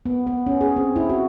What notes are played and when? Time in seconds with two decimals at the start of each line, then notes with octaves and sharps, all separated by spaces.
0.06 B3
0.27 B3
0.46 C#4
0.61 G#4
0.76 C4
0.96 E4
1.09 F#4